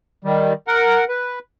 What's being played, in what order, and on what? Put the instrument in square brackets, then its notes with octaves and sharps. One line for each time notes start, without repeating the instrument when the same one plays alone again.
[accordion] D#3 G3
A#4 F#5
B4